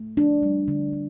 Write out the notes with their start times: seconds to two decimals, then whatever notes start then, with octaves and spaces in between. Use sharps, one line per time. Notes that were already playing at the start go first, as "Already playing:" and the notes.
Already playing: A3
0.17 F3 D4
0.43 G3
0.68 D3
0.93 D3